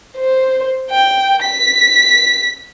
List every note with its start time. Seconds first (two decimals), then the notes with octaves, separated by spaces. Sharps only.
0.17 C5
0.91 G5
1.42 B6